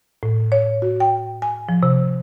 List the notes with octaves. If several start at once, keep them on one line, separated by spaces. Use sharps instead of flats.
A2
C#5
F#4
G5
G#5
F3
C3